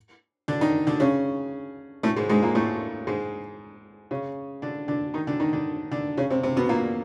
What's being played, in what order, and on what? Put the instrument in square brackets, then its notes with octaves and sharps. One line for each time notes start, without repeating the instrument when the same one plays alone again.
[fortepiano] D3 D4
D#3 D#4
D3 D4
C#3 C#4
A2 A3
G#2 G#3
G#2 G#3
A#2 A#3
A2 A3
G#2 G#3
C#3 C#4
D3 D4
D3 D4
D#3 D#4
D3 D4
D#3 D#4
D3 D4
D3 D4
C#3 C#4
C3 C4
C3 C4
B2 B3
A#2 A#3